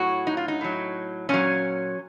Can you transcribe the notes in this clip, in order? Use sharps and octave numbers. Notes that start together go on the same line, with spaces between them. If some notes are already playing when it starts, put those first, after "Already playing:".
Already playing: A2 F#3 F#4
D#4
F4
D#4
A2 F#3
A#2 F#3 C#4